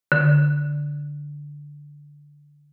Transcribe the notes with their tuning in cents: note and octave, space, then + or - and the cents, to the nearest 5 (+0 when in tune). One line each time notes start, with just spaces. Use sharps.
D3 -5